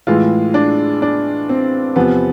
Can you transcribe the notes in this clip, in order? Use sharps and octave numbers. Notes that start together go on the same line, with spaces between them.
A2 E3 G#3 F4
D4
D4
C4
E2 C3 F3 B3